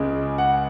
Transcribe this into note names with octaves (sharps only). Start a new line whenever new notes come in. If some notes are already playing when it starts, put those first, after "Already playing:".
Already playing: C#2 C#3 G#3
F#5